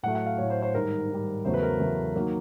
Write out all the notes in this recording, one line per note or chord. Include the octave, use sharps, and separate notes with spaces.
A2 F#3 A3 F#5
F#5
F5
A2 F#3 A3 C#5
C5
C5
G#2 D#3 G3 A#4
G#2 D#3 G3
E2 C#3 F#3 A3 C5
B4
A#4
E2 C#3 F#3 A3
D#3 F#3 A#3